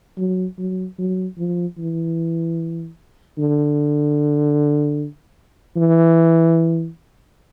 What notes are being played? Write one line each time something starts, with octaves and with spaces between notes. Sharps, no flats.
F#3
F#3
F#3
F3
E3
D3
E3